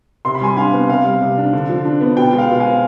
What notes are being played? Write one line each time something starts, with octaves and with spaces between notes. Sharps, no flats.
C3 C6
B5
G3 G#5 C6
D4 F5 G#5
B3
C3 F5
G3
C3
D4
D3
F3
D4
B3
B2 G5
G#3
F5
B2
F5 G#5
C4